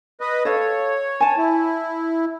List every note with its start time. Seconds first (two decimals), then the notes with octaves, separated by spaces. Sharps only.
0.21 B4 D#5
0.45 A4 C#5 F5
1.20 G#5 A5
1.38 E4